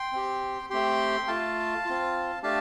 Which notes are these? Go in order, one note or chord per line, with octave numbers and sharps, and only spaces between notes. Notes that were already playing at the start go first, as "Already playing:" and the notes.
Already playing: G5 C6
C4 G4
A3 C4 G4 G5 C6
A3 F4 F5 A5
C4 F4
A3 D4 G4 F5 A5